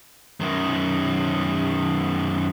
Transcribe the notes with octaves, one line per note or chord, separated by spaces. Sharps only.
F#2 D#3